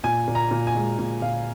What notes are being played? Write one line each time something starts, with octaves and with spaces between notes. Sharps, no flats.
A#2 G#5
A#2
A#5
A#2
G#5
G#3
A#2
A#2 F5